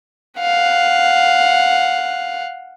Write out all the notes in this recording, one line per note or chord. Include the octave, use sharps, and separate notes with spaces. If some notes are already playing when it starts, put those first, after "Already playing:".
F5 F#5